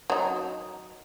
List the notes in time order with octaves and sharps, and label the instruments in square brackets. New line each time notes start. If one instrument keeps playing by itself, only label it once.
[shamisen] F#3 D#4